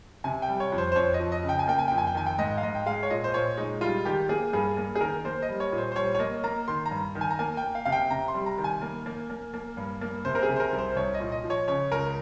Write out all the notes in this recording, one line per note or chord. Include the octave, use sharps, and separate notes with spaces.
C3 G#5
G5
G3
C#5
F2
C5
C5
F2 C#5
D#5
F3
D#5
C#3
G5
G#5
A#3 G5
G#5
F2 G5
G#5
G5
D#3 G#5
G5
G#2 D#5
F5
G#2 D#5
G5
G#3 F5
C#5
A#2 D#5
C5
A#2 C#5
G#3 D#4
G3 F4
D#3 G4
A#3 G#4
G2 G#4
A#3
G#4
D#3 A#4
A#3 C5
D#5
G3
C#5
A#2
C5
C5
G3 C#5
C#5
A#3 D#5
A#3 A#5
D#3 C6
A#5
G2
D#3
G#5
A#5
A#3 G#5
G5
A#3
F5
C3 F5
G5
C3 A#5
C6
G3
A#5
D#3
G#5
A#3
A#3
A#3
A#3
G2
A#3
C3 C5
A#4
G#4
C3
C5
A#4
C2
C5
C2 C#5
D#5
A#2
D#5
F3
C#5
C#3 C#5
C#2 A#4